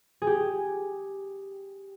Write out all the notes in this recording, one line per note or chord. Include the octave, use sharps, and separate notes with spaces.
G#4
G4